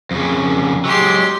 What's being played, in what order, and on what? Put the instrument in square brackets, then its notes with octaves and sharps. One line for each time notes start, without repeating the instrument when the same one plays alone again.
[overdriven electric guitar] F2 C#3
[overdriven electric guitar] F#3 G#3 [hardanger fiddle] G4 C6